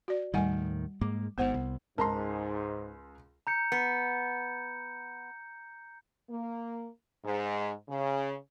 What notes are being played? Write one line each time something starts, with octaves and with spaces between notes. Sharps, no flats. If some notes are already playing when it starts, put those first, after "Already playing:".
F#4 D5
D#2 A2 D#3 G3 F#5 G#5
G#2 G#3 A#3 D6
G#1 G#2 B3 C5 F#5
C2
C#2 G#2 A#4 A5 A#5 C6
A#5 G6 C#7
B3 C#7
A#3
G#2
C#3